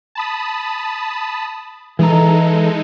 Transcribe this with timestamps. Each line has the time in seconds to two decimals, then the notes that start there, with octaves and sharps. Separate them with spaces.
0.15 A5 B5 D#6
1.99 E3 G#3 D#4 A4 A#5